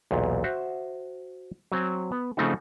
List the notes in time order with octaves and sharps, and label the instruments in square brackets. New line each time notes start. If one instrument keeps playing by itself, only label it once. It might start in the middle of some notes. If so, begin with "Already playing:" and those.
[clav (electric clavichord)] B1 E2 A#2
F#4 C5 E5
F#3 C4 G#5
B3
C#3 F3 A3 C4 D#4 F#4